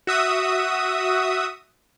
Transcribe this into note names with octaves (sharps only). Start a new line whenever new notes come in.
F#4 E5 D#6